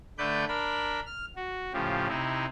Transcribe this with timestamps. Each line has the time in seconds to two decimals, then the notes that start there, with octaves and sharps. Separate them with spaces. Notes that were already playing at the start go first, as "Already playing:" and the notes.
0.18 D3 A3 B4 D5 G6
0.48 D4 A#4 B5
1.06 F6
1.36 F#4
1.73 A2 C#3 F3 G4
2.08 C3 D#4 E4